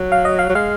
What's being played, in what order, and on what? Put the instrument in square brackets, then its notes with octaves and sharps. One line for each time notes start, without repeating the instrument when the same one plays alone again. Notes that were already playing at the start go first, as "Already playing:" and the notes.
Already playing: [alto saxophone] F#3
[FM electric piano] F5
D#5
F5
[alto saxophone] F#3
[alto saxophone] G#3 [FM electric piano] F5